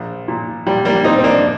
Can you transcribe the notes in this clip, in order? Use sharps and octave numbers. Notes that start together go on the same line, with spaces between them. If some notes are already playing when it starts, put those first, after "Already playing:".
Already playing: A#1
A#2
A#2 G3
G3 A#3
A#2 C4 D#4
C4
A#3 D4
D4